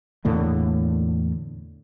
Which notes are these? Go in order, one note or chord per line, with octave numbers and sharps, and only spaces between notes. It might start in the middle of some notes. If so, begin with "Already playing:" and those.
E2 A2 D3 A#3